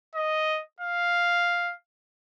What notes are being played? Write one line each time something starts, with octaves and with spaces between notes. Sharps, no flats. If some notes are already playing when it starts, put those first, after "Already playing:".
D#5
F5